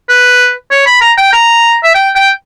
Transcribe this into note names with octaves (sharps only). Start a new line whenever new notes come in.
B4
C#5
B5
A#5
G5
A#5
E5
G5
G5